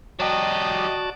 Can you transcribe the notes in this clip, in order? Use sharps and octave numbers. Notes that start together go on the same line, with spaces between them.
F#3 F#4 G4 D5 D#5 A5